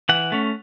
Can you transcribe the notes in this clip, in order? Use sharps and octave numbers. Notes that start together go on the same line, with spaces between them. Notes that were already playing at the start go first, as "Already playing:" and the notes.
E3 F#5
A3 C#4